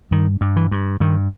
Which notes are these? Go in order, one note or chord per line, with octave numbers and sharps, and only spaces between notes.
G2 D#3
G2
E3
G2
G2 D#3